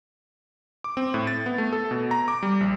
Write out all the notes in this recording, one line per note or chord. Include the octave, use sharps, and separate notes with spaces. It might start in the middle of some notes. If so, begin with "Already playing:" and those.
D6
C4
A2
A6
B3
A3
A4
B2
A#5
D6
G3
A#1